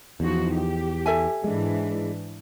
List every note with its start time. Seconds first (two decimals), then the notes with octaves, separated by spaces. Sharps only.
0.20 E2 F3 D#4 F#4
0.53 G4
1.06 A4 E5 G#5
1.44 G#2 E3 G#3 D4